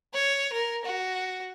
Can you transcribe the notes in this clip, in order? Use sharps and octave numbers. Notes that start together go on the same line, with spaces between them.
C#5
A#4
F#4